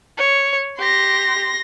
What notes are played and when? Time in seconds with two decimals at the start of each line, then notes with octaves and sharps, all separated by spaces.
0.18 C#5
0.79 G4 C6 A#6